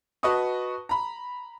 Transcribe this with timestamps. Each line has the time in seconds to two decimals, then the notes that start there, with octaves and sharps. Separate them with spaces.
0.23 F#4 B4 D#5 A5 C#6 D#6
0.89 A#5 B5